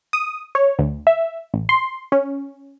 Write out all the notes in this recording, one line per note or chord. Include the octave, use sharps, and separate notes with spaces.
D#6
C#5
D2
E5
A1
C6
C#4